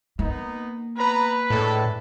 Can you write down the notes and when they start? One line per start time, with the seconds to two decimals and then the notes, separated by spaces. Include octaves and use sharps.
0.19 A#3 B3 D#4
0.97 B3 B4 A#5 B5
1.50 A2 G#3 D4 A4